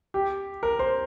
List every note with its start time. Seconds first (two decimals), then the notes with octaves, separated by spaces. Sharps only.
0.14 G4
0.63 A#4
0.79 C5